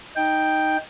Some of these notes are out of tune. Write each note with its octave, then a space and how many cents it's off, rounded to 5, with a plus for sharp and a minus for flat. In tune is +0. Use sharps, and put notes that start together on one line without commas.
D#4 +0 G5 +0